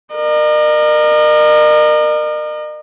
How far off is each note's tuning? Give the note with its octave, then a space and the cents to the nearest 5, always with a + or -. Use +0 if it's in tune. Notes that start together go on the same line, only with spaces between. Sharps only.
A#4 +0 D#5 -45